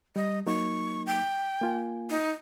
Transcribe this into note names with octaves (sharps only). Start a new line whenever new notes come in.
G3 D#5
F#3 A#3 D#4 C#6
G5
A#3 F4 G#5
D#4